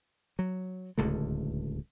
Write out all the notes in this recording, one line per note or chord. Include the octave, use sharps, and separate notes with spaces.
F#3
D1 C#2 D3 A3